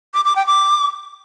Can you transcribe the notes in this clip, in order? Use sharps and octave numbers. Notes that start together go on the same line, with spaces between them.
D6
D6
G5
D6